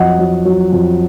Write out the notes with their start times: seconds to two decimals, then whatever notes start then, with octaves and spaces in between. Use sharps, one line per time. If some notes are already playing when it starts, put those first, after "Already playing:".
Already playing: F2 F#3 D#5 F#5
0.19 F#3
0.45 F#3
0.72 F2